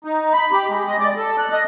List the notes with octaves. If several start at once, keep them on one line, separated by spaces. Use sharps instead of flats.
D#4
B5
G4
G#3
D#5
D5
A4
F#6
D#5